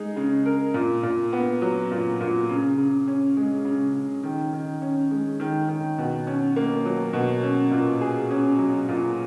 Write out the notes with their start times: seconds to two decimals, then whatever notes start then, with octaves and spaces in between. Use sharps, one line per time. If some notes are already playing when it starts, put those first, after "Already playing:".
Already playing: G#3 D#4
0.16 C#3
0.46 A#4
0.74 A#2
1.03 A#2
1.33 B3
1.62 F#3
1.91 A#2
2.20 A#2
2.49 C#3
2.78 C#3
3.08 C#4
3.37 G#3
3.65 C#3
3.94 C#3
4.23 D#3
4.53 D#3
4.82 C#4
5.11 G#3
5.40 D#3
5.69 D#3
5.98 B2
6.27 C#4
6.56 A#3
6.85 F#3
7.13 B2
7.43 C#4
7.71 A#2
8.01 G#4
8.31 C#4
8.58 F#3
8.88 A#2